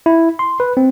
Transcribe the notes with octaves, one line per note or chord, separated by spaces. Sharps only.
E4
C6
B4
C4